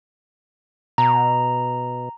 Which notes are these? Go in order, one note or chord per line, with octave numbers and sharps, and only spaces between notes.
B2 A#5